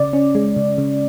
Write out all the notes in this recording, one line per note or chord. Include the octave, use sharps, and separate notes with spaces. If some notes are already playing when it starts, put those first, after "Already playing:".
Already playing: C#3 D5
C#4
G#3
C#3
C#3